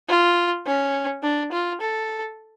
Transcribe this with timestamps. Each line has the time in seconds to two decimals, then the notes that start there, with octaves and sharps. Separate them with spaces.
0.09 F4
0.67 C#4
1.23 D4
1.52 F4
1.81 A4